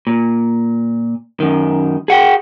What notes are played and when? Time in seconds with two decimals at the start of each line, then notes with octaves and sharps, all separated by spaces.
0.07 A#2
1.40 F#2 D#3
2.08 G#4 F#5 G5